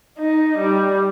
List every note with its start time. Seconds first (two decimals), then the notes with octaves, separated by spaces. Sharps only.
0.18 D#4
0.58 G3